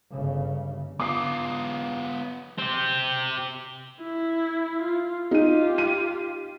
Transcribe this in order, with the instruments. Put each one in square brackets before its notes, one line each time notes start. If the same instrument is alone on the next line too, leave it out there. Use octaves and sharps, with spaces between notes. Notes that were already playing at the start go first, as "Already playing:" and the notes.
[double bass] G1 C#3
[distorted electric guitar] B3 F4 [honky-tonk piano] D6 D#6 C7
[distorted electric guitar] C4 G4
[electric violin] E4
F4
[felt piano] D#4 D#7 [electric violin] F4 G4
[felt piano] D#7